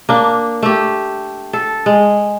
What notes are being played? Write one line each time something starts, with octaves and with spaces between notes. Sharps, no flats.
A#3 D4
A3 G4
A4
G#3